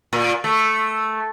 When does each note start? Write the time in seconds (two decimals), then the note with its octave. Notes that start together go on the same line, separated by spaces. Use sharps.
0.13 A#2
0.44 A3